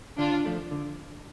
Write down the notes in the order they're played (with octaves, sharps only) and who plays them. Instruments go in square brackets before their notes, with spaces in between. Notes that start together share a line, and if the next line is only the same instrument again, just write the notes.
[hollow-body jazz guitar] D3 [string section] D4 F4
[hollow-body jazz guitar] F3 A3 D4
D3